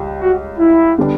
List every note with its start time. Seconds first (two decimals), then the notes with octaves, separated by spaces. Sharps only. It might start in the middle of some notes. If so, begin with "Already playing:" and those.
Already playing: C#2 G3
0.21 F#4
0.59 E4
0.98 D3 G3 B3 D4